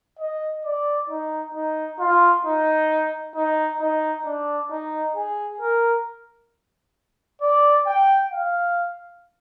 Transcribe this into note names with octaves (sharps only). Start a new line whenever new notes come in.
D#5
D5
D#4
D#4
F4
D#4
D#4
D#4
D4
D#4
G#4
A#4
D5
G5
F5